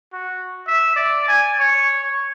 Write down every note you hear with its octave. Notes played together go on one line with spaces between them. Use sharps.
F#4
E5
D5
G#5
C#5